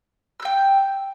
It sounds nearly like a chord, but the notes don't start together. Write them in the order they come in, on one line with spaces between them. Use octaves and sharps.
E6 G6 G5